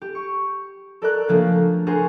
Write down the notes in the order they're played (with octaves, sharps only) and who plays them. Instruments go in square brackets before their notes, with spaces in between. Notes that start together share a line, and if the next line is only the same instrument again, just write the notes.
[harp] G4
C#6
A4 A#4 D5 A#5 D6 F#6
C#3 F3 A3 A#3 D4 F4
D4 F#4 G#4 A#4 C5